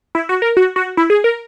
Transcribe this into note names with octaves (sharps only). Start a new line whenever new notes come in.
E4
F#4
A#4
F#4
F#4
E4
G#4
A#4